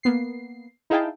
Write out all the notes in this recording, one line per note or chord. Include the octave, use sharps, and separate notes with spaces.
A#3 B3 C7
D#4 E4 G#4 F5 G5 A5